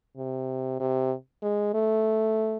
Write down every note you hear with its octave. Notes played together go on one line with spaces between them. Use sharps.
C3
C3
G#3
A3